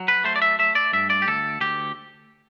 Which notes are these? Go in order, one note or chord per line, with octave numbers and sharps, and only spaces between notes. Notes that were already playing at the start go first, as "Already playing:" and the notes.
Already playing: F#3
B4
A3 C5
D5
E5
A3 E5
D5
G2 E5
D5
G4
D2 A4
D2 G4